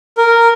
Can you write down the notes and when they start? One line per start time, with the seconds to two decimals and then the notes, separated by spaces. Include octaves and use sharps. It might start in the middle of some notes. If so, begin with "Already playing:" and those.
0.18 A#4